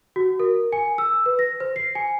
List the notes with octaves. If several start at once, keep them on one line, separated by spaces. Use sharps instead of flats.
F#4
A#4
G#5
E6
B4
A#6
C5
C7
G#5